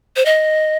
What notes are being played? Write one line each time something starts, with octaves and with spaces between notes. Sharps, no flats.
C5
D#5